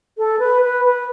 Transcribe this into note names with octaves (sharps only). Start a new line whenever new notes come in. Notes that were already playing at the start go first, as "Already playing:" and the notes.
A4
B4
B4
B4